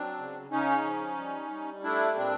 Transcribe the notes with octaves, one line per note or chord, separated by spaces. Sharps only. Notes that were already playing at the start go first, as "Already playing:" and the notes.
Already playing: F#3 C4 D4
C#3
C#3 C#4 D#4
F3
G3
G3
A3 D4 E4
A#2 C4 D4